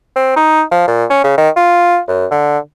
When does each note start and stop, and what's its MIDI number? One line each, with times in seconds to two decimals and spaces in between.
0.16 0.36 60
0.36 0.63 63
0.71 0.86 53
0.88 1.05 46
1.10 1.23 61
1.24 1.34 49
1.38 1.49 51
1.56 1.99 65
2.08 2.26 42
2.31 2.58 50